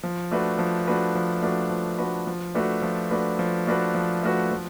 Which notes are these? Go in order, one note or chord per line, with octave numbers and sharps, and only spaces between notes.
F3
A3 D4 F#4 B4
F3
A3 D4 F#4 B4
F3
A3 D4 F#4 B4
F3
A3 D4 F#4 B4
F3
A3 D4 F#4 B4
F3
A3 D4 F#4 B4
F3
A3 D4 F#4 B4
F3
A3 D4 F#4 B4
F3